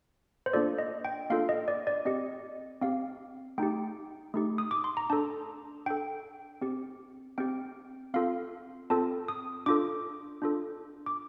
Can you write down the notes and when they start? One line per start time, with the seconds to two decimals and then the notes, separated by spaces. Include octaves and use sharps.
0.46 C5
0.53 A#3 D4 F4 A4 D5
0.78 D#5
1.05 G5
1.30 A#3 D4 F4 A4 F5
1.49 D#5
1.68 D5
1.87 D5
2.05 C4 G4 D#5
2.81 C4 G4 F5
3.58 A3 D#4 G4 G5
4.34 A3 D#4 G4
4.58 D#6
4.71 D6
4.84 C6
4.97 A#5
5.10 D4 A4 A5
5.86 D4 A4 G5
6.61 C4 G4
7.38 C4 G4 G5
8.14 C4 F4 A4 F5
8.90 C4 F4 A4 A5
9.28 D#6
9.66 D4 F4 A4 D6
10.42 D4 F4 A4
11.06 D6